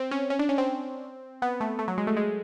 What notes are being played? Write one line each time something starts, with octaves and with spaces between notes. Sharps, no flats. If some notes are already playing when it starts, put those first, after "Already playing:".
Already playing: C4
C#4
C#4
D4
C#4
C4
B3
A3
A3
F#3
G#3
A3
G#3